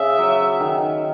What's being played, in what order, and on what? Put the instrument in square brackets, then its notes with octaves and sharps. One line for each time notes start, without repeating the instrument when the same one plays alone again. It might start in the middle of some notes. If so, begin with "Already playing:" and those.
Already playing: [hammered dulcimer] C#3 [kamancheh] E5
[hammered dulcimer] F#3
D#3